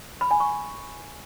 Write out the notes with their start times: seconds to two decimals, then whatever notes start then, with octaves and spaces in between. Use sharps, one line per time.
0.21 B5
0.31 G#5
0.40 C#6